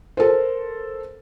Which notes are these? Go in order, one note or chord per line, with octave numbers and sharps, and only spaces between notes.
A4 A#4 C5